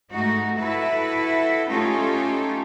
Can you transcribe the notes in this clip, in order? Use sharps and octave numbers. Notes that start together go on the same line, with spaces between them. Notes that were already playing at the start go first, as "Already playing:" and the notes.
G#2 A3 D#4 F#4
E4 F#4 A4 B4 E5
A3 C#4 D#4 F4 G4 A4